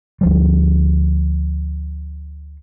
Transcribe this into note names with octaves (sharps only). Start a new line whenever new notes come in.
D2 F3 G3